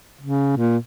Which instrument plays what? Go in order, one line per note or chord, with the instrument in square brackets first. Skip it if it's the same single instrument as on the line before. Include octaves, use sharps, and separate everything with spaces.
[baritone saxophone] C#3
A#2